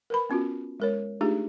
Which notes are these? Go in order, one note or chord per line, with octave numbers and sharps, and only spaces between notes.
A#4 B4 B5
B3 C#4 F4 F#4
G#3 A#4 C#5
A3 D4 D#4 F4 G4 G#4